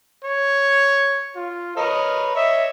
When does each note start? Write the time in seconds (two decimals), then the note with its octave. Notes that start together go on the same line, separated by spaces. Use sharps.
0.24 C#5
1.36 F4
1.77 A#4 B4 C#5 D#5
2.35 C#5 D#5 E5